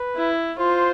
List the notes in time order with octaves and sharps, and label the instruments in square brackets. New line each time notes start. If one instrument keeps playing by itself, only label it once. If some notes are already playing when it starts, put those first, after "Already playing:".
Already playing: [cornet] B4
[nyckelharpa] E4
[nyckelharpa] F4 [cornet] C5